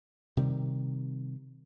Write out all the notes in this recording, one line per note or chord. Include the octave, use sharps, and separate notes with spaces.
C3 D#3 G3